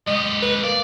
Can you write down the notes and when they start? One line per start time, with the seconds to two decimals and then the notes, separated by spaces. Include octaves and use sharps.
0.07 G#2 G4 D#5
0.43 B4
0.64 A#3 D5